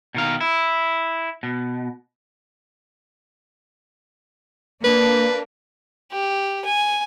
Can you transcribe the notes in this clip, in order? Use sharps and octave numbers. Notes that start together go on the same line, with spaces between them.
B2 D#3 F5
E4
B2
A#3 D4 A#4 B4
G4
G#5